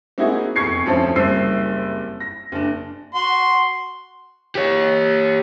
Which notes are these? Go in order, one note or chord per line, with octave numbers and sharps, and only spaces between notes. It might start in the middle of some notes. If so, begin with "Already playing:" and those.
A#3 C4 D#4 E4 F#4 G#4
F1 E2 C#6 G#6 C7 C#7
F1 D2 F3 C#4 A4 C5
F#1 C2 G3 C5 E6 C7
A#6
F#1 D4
F#4 C6
G4 C#5